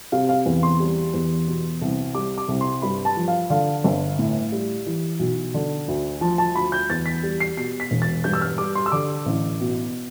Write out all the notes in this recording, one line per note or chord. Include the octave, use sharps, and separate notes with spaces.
C3 F5
F5
E2
C6
G3
E2
B2
C2
G3 D6
D6
C2
C6
G2 B5
A5
F3
F5
D3 F5
G1
A2
G3
E3
B1
D3
D2
F3 A5
A5
D2 B5
G6
E2 A6
B6
G3
C7
B2 C7
B6
E1
A6
G2 G6
E6
F6
G3 D6
C6
E6
D3 D6
A1
B2